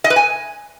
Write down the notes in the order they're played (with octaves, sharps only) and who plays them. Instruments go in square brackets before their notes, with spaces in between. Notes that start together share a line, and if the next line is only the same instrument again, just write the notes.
[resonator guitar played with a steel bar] D#5
B4
G#5